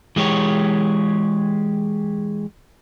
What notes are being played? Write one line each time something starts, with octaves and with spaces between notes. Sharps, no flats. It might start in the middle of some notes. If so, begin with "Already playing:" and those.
E3 G#3 G4 C#5